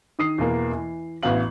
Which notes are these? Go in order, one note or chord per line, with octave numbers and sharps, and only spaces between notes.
D#3 D#6 C7
E2 B2 A#3 B3
E3
A1 B3 F#4 F5 F#7